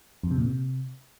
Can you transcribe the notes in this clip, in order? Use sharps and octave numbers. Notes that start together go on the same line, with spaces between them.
F2
C3
A#2
C3